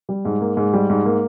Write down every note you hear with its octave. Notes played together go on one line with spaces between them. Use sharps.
G3
G#2
A#3
G#2
G3
G#2
A#3